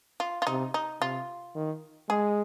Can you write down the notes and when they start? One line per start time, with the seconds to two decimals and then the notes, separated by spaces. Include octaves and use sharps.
0.20 F4
0.42 F4
0.47 C3 D#4
0.74 D#4
1.01 C3 F4
1.56 D#3
2.10 G#3 G#4